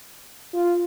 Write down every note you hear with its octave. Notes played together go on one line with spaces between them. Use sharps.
F4